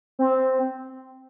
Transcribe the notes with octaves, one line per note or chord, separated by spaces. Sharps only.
C4